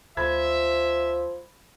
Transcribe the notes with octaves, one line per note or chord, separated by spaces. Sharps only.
D2 F3 E5 B5 G#6